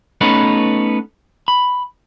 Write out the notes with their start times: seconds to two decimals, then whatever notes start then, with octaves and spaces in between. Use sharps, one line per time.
0.21 A3 B3 C#4 D#4 B4
1.48 B5